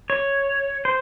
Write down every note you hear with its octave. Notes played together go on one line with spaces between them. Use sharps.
C#5
C5